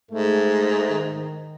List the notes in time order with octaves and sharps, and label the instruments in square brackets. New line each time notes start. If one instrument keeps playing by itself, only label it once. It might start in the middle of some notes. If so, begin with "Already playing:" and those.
[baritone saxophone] G#2 [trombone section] A3
[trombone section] D#3